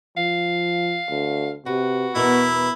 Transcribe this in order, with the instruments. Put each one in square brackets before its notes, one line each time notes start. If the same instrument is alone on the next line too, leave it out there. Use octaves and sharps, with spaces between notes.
[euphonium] F3 [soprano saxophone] F5
[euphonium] D2
[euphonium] C3 [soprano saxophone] F#4 [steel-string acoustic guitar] B4
[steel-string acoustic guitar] E2 B2 A#4 [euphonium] B3 [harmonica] E4